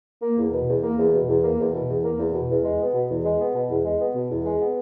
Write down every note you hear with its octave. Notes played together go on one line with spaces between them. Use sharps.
A#3
E2
B2
E2
A#3
E2
B2
E2
A#3
E2
B2
E2
A#3
E2
B2
E2
G#3
B3
B2
E2
G#3
B3
B2
E2
G#3
B3
B2
E2
G#3
B3